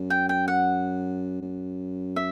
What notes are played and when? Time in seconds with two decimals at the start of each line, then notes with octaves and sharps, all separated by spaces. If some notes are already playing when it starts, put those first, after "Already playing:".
Already playing: F#2
0.10 G5
0.29 G5
0.48 F#5
1.42 F#2
2.16 E5